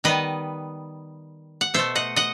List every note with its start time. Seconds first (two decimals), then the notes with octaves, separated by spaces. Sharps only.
0.04 D#3 G3 B3 B4 D#5
1.61 F#5
1.74 B2 A3 C5 E5
1.95 D#5 F#5
2.16 D#5 F#5